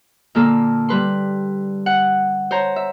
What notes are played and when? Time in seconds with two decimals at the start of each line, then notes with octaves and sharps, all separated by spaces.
0.35 A#2 D3 A#3 A4
0.89 G3 B4 C6
1.86 F#5
2.51 C5 C#5 A#5
2.76 E5